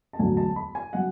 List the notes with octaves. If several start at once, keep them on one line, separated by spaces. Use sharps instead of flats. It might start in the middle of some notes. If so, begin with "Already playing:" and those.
A5
E1 D2 D3 F#3 A3 G#5
A5
B5
G#5
C#3 F#3 F#5